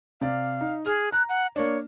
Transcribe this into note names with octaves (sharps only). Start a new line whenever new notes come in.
C3 D5 F5
D#4
G#4 F6
A#5 F#6
F#5
A#3 D4 C#5